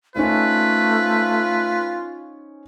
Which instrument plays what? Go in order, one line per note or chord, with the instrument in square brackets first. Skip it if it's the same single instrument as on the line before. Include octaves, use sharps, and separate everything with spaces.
[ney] A3 [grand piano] C#4 D#4 C5 [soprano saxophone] F4 [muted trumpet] B4